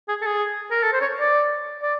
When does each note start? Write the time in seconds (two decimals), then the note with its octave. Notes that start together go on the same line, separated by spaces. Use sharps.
0.08 G#4
0.22 A4
0.27 G#4
0.71 A#4
0.83 A4
0.93 C5
1.01 C#5
1.20 D5
1.82 D5